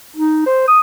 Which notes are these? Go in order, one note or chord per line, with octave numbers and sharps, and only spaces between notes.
D#4
C5
D#6